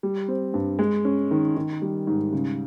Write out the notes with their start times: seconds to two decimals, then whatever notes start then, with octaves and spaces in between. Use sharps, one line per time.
0.03 G3
0.28 C4
0.54 G2
0.79 G#3
1.05 C#4
1.31 D#3
1.57 D#3
1.82 G3
2.07 G#2
2.33 C#3